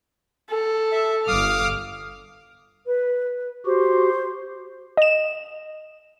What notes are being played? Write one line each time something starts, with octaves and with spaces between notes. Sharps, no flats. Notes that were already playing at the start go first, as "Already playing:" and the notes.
A4
E5
G1 F5 D6 D#6 F6
B4
F#4 G4 C5
D#5 E7